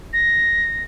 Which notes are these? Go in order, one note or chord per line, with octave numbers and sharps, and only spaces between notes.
A#6